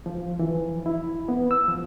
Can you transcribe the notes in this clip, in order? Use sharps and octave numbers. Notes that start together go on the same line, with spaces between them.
F3
E3
E4
B3
E6
F3